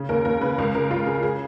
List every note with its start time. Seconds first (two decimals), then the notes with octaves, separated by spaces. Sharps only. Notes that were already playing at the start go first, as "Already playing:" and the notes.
Already playing: C#3
0.09 D#2 A#4
0.25 D#2 A#4
0.41 C#3 B4
0.58 C#2 A#4
0.74 C#3 A#4
0.91 C#2 F4
1.06 C#3 G#4
1.23 G#4